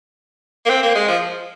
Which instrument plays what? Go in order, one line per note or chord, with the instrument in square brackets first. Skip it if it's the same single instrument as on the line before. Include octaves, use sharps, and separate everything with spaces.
[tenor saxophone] A#3
C4
A#3
G#3
F3